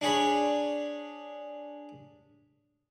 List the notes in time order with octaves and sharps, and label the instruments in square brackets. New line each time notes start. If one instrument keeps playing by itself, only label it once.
[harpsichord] D4 G#4 C#5 B5